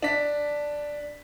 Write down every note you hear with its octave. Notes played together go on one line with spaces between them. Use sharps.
D4 B6